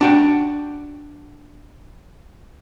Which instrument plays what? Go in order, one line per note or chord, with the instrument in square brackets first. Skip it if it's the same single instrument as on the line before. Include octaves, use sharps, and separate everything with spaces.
[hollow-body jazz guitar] D4 F#4 G5